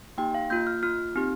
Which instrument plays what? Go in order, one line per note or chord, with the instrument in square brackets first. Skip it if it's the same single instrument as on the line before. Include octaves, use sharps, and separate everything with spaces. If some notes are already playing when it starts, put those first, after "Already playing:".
[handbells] A#3 D#4 G4 G5
F5
A#3 F4 G6
F6
A#3 F4 F6
C4 D#4 G4